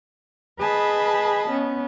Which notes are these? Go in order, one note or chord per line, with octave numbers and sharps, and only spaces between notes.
G#4 B4 D#5 A5 B5
B3 C#4